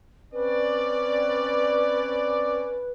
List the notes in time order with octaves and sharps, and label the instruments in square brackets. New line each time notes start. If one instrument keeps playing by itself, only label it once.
[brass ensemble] C4 C#4 D5 [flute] B4